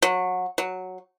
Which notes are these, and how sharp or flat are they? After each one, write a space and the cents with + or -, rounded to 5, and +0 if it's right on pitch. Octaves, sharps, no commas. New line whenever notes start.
F#3 -20
F#3 -5